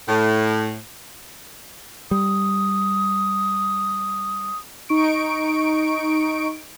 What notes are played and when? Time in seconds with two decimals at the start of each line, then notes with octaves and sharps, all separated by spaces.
0.09 A2
2.11 G3 D#6
4.89 D#4 C#6 D7